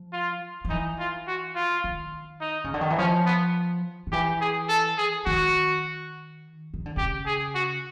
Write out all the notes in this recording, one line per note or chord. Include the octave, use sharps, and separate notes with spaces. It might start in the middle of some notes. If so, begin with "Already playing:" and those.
Already playing: F3
F4
F3
E3 D#4
F4
F#4
F4
D#3
D#4
C#3
D3
D#3
E3
F3 C#4
B3
D#3
E3 G4
G#4
A4
G#4
D#3 F#4
D#3
D3
C#3 G4
G#4
F#4